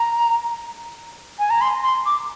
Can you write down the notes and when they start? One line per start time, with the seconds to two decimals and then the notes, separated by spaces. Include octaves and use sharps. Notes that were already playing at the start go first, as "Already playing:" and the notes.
Already playing: A#5
1.39 G#5
1.50 A#5
1.61 C6
1.83 C6
2.06 D6